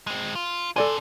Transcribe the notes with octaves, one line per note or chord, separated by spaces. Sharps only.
G#3 C4
F4
D4 A4 C5 D5 G#5